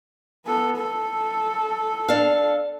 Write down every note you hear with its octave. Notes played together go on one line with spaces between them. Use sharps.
B3 A4
A4
D4 F5